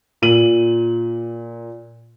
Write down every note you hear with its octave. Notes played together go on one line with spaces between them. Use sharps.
A#2 D#7 F#7